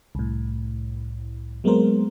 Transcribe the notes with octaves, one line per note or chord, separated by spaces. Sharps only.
C2 A2
F#3 G#3 A#3 B3 A#4 C5